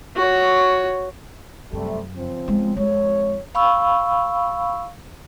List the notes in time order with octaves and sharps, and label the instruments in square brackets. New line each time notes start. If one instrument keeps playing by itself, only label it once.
[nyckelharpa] F#4 C#5
[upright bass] F#2 [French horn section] C3 G3 A3
[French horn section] C#3 F3 C4
[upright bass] G#3 B3
[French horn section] F2 C#5 [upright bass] G#3
[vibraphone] F5 B5 C#6 E6